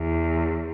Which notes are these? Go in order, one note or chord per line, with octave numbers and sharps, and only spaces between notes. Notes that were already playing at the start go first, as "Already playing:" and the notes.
Already playing: E2